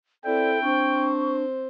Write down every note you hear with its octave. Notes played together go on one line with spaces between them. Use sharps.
C4 E4 A4 D5 G5
C4 D4 C5 C#6